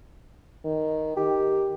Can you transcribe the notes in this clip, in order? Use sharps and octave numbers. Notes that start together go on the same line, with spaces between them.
D#3
D#3 G4